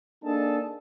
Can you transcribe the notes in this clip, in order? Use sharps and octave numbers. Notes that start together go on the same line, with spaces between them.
A#3 D4 D#4 G#4 A4 A5